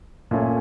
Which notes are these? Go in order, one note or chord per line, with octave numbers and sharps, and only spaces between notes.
A#2 A3 C#4